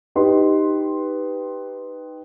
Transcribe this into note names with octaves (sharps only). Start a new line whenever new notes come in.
D#4 G4 B4 C6